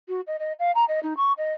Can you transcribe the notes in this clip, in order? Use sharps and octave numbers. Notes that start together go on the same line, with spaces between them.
F#4
D#5
D#5
F5
A#5
D#5
D#4
C#6
D#5